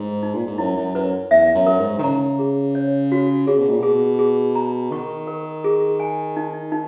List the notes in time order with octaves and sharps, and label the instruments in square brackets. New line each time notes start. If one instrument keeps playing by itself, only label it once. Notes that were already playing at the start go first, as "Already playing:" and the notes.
Already playing: [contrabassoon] G#2
[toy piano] D#4
[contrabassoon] A#2
G#2
[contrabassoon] F#2 [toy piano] E4
[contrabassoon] F#2
[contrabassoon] F#2 [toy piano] B4
[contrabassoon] E2 [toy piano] E5
[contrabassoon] F#2
[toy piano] A#4
[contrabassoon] G#2
D#3
[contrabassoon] C#3 [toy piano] A#5
[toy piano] G#4
C#5
F#4
[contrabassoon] C#3 [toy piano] G#4
[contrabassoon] B2
A#2
[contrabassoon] B2 [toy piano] G#4
[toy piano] G#4
A#5
[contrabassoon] D#3 [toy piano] C#6
[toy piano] A#4
G#4
G#5
D#4
D#4